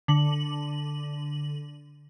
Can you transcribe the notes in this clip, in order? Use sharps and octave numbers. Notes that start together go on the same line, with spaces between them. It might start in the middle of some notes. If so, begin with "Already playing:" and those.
D3 F#7